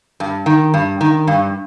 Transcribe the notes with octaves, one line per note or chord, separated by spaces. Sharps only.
G2
D#3
G2
D#3
G2